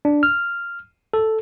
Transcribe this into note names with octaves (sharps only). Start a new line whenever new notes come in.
D4
F6
A4